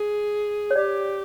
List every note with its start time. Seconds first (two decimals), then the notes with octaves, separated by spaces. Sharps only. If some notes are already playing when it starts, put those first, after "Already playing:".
Already playing: G#4
0.71 C#5
0.76 G4 D5